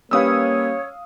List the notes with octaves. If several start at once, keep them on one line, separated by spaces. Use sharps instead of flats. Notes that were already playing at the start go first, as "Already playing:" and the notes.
G3 A#3 C#4 B4 C#5 F5 D#6 E6